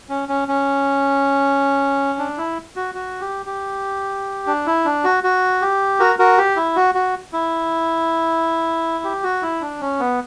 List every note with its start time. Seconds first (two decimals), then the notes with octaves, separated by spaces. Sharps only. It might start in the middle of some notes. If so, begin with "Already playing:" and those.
0.09 C#4
0.29 C#4
0.48 C#4
2.19 D4
2.38 E4
2.76 F#4
2.95 F#4
3.21 G4
3.46 G4
4.47 D4
4.66 E4
4.85 D4
5.04 F#4
5.24 F#4
5.62 G4
6.00 F#4 A#4
6.19 F#4 A#4
6.38 G4
6.56 E4
6.76 F#4
6.95 F#4
7.33 E4
9.04 G4
9.23 F#4
9.42 E4
9.61 D4
9.81 C#4
10.00 B3